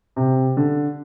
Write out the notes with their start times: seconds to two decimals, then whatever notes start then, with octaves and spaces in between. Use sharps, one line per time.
0.16 C3
0.57 D3